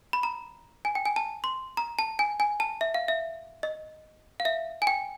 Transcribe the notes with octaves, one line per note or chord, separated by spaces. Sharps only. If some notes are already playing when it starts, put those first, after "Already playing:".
B5
A#5
G#5
G5
G#5
A5
C6
A#5
A5
G#5
G#5
A5
E5
F5
E5
D#5
F5
E5
G#5
G5